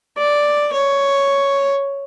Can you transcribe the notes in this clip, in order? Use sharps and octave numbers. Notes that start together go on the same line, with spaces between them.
D5
C#5